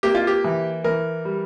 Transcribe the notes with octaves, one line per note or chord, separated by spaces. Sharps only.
A#3 G4
F4
G4
E3
E3 A#4
G3